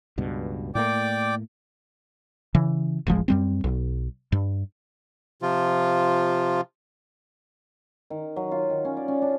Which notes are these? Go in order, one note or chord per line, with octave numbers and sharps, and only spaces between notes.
C#2 G2 B2
A2 A3 A#3 D5 G5 D6
C#3 E3
E1 A1 F3 G#3
F#2 G3 C4
B1
G2
C3 F3 F4
D#3
F#3
F4
D#3
C#4
D5
C#4
D4